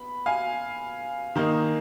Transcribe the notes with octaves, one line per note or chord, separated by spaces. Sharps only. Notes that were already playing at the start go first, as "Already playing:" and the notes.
Already playing: B3 B5
F5 G#5
D#3 A#3 D#4